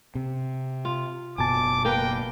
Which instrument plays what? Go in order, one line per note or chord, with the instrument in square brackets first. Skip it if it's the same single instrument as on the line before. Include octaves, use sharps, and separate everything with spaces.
[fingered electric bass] C3
[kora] F4
[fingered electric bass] F#1 B2 [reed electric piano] G#5 A5 [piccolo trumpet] D6
[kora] A#3 A#4 B4 [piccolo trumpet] G5